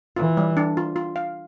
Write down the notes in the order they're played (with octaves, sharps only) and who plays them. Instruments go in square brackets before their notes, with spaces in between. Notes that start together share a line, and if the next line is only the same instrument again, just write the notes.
[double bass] E3 [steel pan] F4
[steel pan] G3
D4
F4
F4
F5